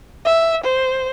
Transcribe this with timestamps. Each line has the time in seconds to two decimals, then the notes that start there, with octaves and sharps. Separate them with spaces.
0.25 E5
0.64 C5